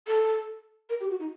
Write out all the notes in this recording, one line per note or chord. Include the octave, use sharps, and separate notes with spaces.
A4
A#4
G4
F#4
D#4